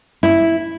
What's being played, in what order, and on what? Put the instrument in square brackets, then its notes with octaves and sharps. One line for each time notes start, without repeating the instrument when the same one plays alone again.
[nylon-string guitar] E4